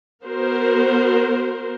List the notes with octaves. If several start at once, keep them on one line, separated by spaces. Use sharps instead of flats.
B3 F#4 A#4 C5